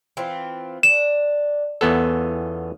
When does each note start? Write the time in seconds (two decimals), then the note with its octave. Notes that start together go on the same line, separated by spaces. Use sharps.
0.17 E3 C4 F4
0.83 D4 E7
1.81 E2 B3 C#4 F4 A4